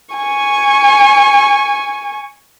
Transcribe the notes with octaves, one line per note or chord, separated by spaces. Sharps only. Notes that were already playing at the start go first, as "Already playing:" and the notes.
G#5 C#6